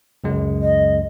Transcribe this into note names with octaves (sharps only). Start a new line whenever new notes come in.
C#2 F#2 G#3
D#5